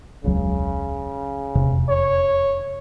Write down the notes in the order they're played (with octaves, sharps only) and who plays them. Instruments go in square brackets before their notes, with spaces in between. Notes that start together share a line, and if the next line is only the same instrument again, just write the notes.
[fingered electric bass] E1 C#2 F#3 [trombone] C#3
[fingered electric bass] E1 F2 C3
[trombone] C#5